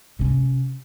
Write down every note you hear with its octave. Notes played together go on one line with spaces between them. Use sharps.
C3 C#4